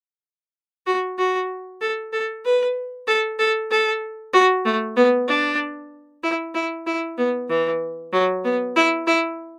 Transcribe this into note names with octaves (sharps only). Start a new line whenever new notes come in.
F#4
F#4
A4
A4
B4
A4
A4
A4
F#4
A3
B3
D4
E4
E4
E4
B3
E3
F#3
B3
E4
E4